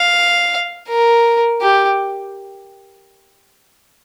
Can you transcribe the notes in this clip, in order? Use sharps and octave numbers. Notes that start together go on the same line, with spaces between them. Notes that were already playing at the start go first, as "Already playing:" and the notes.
Already playing: F5
A#4
G4